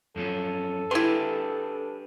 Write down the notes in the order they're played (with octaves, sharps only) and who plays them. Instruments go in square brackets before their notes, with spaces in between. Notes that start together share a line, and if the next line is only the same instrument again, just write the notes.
[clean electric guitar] F#2 F3 C#4 [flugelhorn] A4
[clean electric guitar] D4 G4 G#4 [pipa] E4 C6 [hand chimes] B4